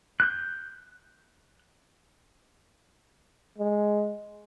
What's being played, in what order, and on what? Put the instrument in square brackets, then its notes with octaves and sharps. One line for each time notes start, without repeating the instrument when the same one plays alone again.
[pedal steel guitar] F#6 G6
[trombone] G#3